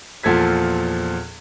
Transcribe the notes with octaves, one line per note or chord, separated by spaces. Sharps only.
E2 A#2 F3 A4 G#6 B6